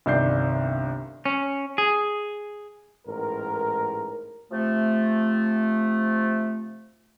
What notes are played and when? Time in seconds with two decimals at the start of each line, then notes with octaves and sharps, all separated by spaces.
0.06 G1 C2 D#3 D5 G6 C7
1.25 C#4
1.78 G#4
3.07 A1 G#2 A#4
4.51 C3 F3 A3